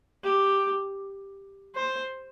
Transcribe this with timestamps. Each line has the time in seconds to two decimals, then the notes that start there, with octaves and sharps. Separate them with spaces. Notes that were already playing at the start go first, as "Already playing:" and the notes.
0.23 G4
1.75 C5